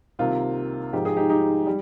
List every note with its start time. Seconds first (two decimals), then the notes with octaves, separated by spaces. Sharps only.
0.19 C2 C3 D#3 A#3 F4
0.93 G#2 F3 G#3 G4
1.05 G#4
1.17 D#4 G4
1.29 D#4 G4
1.67 G3